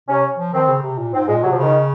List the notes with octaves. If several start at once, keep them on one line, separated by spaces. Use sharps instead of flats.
C3 C#4
F3
D#3 C4
C#3
C3
A#2
G#2 C4
A#2 G#3
C3 F#3
F3
C#3
D#3